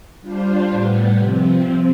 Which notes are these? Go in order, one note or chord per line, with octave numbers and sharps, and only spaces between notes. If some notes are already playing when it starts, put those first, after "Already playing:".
G3 D4 F4 C5
A2 G3 B3
C3 F3 C4